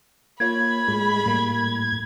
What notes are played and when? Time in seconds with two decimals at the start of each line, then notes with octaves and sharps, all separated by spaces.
0.40 A#3 F4 C#5 B5 G#6
0.88 A2 G#3
1.26 A2 G3 A#3